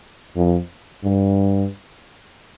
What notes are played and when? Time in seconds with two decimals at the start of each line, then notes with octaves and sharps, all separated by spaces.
0.36 F2
1.04 G2